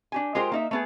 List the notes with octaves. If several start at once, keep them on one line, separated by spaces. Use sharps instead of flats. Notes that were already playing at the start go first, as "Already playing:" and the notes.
D4 G4 G#5
G#3 F4 G4 A#4 C5
A#3 D#4 E5
A3 B3 G#4